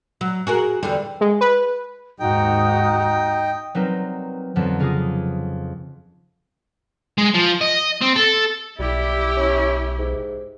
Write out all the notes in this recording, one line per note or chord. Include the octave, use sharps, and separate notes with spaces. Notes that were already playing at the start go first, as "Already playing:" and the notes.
F#3
F#4 G#4 A#4
E2 D3 G3
G#3
B4
D#2 G#2 D#4 F#4 G5 A#5 D#6
F#3 G3 C4 D#4 A#4 B4
F2 D3 F3 F#3 B3 C4
C#3 F4 G#4 D6 D#6 A#6
G#3
F3
D#5
C4
A4
B1 G3 E4 G4
C#4
G#2